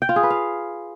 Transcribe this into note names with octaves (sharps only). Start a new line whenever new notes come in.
G5
F4
G#4
B4
F5